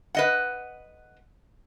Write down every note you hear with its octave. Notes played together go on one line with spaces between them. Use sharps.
B4 D#5 F#5